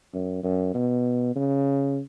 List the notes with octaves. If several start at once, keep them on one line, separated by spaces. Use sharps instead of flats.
F#2
F#2
B2
C#3